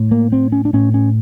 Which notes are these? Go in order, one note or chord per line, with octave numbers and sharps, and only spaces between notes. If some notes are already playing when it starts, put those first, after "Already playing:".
Already playing: A2
A#3
C4
C#4
D4
A2 C#4
C#4